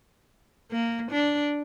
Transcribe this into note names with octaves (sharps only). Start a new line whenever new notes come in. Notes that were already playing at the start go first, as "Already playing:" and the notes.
A#3
D4